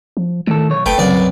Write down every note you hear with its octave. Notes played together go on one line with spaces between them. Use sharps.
F3
A2 D#3 A4
B1 C#5
F#1 A3 B4 G5
C2 F#2 C#3 D5